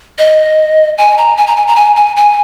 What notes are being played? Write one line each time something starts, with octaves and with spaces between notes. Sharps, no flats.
D#5
G#5
A#5
G#5
A#5
G#5
A#5
G#5
G#5
G#5